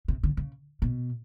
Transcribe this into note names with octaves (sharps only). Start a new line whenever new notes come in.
C3
D3
C#3
B2